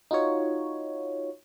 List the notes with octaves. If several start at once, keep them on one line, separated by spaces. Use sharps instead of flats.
D#4 F4 F#4 C#5